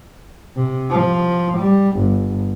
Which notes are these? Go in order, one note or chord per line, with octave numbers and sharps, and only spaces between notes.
C3
F3
G3
G1